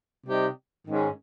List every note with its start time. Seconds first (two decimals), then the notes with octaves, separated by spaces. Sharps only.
0.25 C3 G3 C4 D#4 G4
0.86 G#2 D#3 G#3 C#4